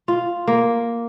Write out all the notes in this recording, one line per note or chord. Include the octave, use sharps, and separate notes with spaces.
F4
A#3